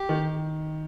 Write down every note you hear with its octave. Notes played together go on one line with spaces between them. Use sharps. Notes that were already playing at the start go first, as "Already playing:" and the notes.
Already playing: G4
D#3